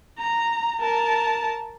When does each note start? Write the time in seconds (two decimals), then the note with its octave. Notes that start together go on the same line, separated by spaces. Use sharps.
0.19 A#5
0.81 A#4 A5